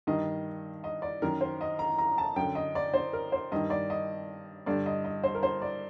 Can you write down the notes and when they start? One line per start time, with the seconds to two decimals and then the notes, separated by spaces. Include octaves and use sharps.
0.07 G2 D#3 D#5
0.84 D#5
1.02 D5
1.22 F#2 D#3 A#4
1.41 C5
1.61 D#5
1.79 A#5
1.98 A#5
2.18 A5
2.36 F#2 D3 G5
2.55 D#5
2.75 D5
2.94 C5
3.13 A#4
3.32 C5
3.52 G2 D#3 D#5
3.70 D5
3.90 D#5
4.66 G2 D3 D5
4.86 D#5
5.04 D#5
5.24 C5
5.35 A#4
5.43 C5
5.62 D5